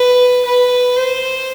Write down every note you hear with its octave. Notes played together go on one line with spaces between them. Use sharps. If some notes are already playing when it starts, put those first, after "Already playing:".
Already playing: B4
B4
C5